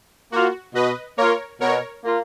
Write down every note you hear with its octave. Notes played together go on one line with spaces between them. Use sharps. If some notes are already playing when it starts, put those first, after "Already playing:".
A#3 F4 F#4
B2 B4 D#5
A#3 F4 A#4 C#5
B2 A#4 C#5
A#3 F4